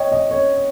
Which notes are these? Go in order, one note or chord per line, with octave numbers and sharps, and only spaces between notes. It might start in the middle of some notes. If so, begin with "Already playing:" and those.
Already playing: C#5 D#5 G5
D#5
C#5